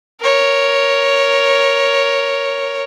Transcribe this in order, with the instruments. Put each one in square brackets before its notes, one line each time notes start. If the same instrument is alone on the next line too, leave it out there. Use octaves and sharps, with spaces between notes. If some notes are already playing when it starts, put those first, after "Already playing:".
[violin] A#4 C#5